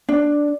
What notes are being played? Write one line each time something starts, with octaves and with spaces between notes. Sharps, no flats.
D4